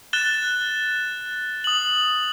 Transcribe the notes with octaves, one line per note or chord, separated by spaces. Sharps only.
F#6 A6 E7 G7
D#6 F#7